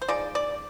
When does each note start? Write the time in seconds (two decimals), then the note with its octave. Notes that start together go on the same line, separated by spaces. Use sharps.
0.02 C5
0.08 F3 G#3 D#4 D5
0.35 D5